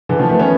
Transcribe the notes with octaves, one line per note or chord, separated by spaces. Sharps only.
D3 E3
D#3 F3
A3 B3
B3 C#4